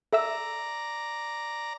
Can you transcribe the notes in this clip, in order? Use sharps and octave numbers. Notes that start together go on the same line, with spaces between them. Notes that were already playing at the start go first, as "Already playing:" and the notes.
A4 D5 E5 A#5 E6